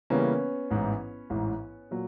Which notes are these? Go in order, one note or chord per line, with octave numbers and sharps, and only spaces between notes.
C#3 E3 G3 A#3 B3 C#4
A1 G#2 E3
A1 G#2 E3
A#2 F#3